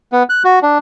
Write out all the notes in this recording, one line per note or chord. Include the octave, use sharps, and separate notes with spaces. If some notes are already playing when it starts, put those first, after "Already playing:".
B3
F#6
F#4
D4